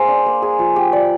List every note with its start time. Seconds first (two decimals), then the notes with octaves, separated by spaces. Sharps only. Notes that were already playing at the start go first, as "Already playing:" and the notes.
Already playing: A#3 G#4 C5
0.08 D4
0.26 A#3
0.42 G#4
0.59 F3
0.76 G4
0.93 D5